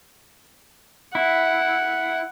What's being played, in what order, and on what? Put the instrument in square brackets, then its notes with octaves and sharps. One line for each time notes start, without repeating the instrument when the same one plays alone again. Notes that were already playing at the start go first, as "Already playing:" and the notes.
[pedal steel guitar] E4 [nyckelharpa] F#5